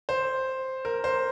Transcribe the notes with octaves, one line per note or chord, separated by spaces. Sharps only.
C5
A#4
C5